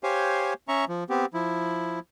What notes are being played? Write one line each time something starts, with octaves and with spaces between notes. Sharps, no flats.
G4 C5 C#5 F5 G#5
C#4 E5 A#5 C#6
F3
B3 C4 G4
F3 E4